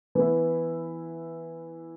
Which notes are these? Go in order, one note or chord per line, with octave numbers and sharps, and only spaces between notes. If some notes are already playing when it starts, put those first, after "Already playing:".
E3 B3 E4